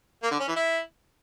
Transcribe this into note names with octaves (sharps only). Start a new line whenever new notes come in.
A#3
D3
C#4
E3
E4